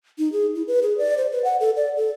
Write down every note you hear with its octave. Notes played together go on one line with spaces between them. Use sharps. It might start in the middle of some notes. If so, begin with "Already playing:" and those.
D#4
G#4
E4
B4
G#4
D5
C5
B4
F#5
A4
D5
A4